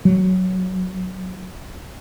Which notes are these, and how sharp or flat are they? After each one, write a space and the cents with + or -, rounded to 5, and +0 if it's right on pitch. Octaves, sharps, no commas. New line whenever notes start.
F#3 +5